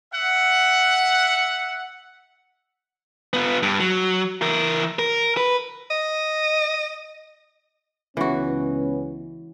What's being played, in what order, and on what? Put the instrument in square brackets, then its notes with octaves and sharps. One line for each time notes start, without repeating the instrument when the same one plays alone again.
[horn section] E5 F#5
[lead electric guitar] B3 F4
G2
F#3
E3 A#4
A#4
B4
[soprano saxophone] D#5
[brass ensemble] C#2 B3 C#4 [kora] E3 F#4